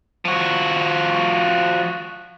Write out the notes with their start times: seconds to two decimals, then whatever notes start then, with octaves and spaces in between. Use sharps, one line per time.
0.25 F3 F#4